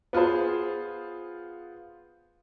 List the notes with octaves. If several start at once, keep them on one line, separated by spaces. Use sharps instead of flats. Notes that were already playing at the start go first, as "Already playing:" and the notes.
B3 F4 G#4 C5